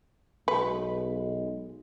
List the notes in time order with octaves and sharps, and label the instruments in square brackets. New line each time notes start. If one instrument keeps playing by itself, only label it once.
[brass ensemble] B1 G#3 [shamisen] B4